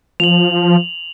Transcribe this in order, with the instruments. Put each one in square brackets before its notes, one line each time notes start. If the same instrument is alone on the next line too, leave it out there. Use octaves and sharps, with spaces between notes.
[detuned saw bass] F3 [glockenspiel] F7 F#7